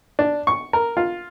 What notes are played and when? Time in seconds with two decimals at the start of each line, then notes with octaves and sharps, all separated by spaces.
0.19 D4
0.47 C#6
0.73 A#4
0.97 F4